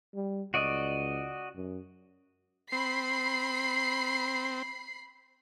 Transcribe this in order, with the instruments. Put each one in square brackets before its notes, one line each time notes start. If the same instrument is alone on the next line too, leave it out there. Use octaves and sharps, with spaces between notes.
[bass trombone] G3
[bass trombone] C#2 [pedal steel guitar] F#4 D5 D#5
[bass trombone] F#2
[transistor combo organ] C4 [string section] B5 C7